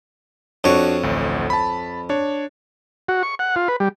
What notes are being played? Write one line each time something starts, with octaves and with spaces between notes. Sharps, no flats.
F2 D4 F#4 C#5
A1 D2
A5 B5
D4 C#5
F#4
C#6
F#5
F4
B4
G3